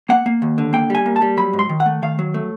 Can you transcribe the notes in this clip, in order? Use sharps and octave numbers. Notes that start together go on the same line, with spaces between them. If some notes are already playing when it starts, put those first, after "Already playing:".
A#3 F#5
A#3
D#2
D3
A#3 G5
G3 G#5
A#3
A5
G3
F#3 B5
G#2
C6
D#3
F#5
A3
D#3 F5
F#3
A3